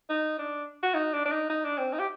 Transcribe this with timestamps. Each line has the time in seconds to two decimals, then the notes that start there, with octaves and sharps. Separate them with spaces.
0.10 D#4
0.39 D4
0.83 F#4
0.94 D#4
1.14 D4
1.26 D4
1.32 D#4
1.50 D#4
1.64 D4
1.78 C4
1.93 D#4
1.99 G4